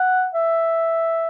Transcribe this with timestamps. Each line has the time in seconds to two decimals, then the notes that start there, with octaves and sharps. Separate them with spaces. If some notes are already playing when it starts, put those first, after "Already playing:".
Already playing: F#5
0.34 E5